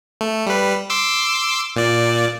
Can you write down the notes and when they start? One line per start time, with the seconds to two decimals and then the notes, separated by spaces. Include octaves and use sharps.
0.21 A3
0.46 G3 B4
0.90 C6 D6 E6
1.76 A#2 D5